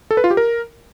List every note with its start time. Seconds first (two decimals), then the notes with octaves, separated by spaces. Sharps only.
0.11 A4
0.17 B4
0.24 F4
0.31 G4
0.37 A#4